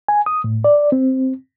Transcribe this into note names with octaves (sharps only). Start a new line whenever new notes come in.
G#5
D#6
A2
D5
C4